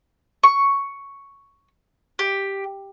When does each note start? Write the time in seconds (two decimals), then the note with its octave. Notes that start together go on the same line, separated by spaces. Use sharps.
0.43 C#6
2.19 G4